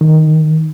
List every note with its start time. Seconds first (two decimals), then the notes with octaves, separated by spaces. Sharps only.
0.01 D#3